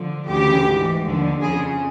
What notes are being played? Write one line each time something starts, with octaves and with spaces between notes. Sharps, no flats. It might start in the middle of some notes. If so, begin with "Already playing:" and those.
Already playing: D3 F3
D2 C#3 E3 G4
G#2 E3
D#2 D3 F3
F2 C#3 F3 G#4